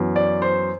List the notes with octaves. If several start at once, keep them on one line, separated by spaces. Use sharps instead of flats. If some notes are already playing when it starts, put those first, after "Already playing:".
Already playing: F#2 E3 B3
D5
C5